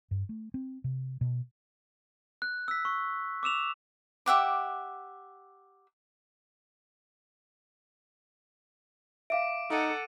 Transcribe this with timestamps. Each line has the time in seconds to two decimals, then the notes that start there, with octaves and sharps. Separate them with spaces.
0.11 G2
0.29 A3
0.54 C4
0.84 C3
1.21 B2
2.42 F#6
2.68 E6 B6
2.85 C#6
3.43 D6 E6 E7 F7
4.26 G4 E5 F#5 D6
9.30 E5 F5 D6 D7
9.70 D#4 A4 F#5 D6 D#7